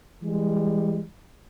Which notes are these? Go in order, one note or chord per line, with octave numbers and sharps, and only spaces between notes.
E3 G3 G#3